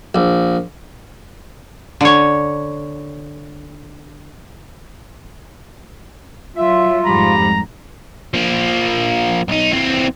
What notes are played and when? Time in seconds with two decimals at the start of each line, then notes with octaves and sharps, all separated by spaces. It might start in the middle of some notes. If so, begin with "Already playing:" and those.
0.15 A#1
2.01 D3 C#5
6.56 F#3 F4 E5
7.06 F2 G#2 G3 G4 A#5 B5
8.34 F3 A#3
9.48 B1 D#4
9.72 E3 C4